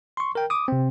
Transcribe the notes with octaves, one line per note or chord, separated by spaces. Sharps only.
C6 C#6
A#4 G5
D6 D#6
C3 C4